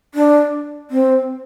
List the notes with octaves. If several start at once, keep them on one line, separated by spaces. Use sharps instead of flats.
D4
C4